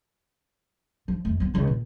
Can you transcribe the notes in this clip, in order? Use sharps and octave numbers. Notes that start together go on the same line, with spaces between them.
F3
F2 A3
B3 C4
C#2 E3
A#2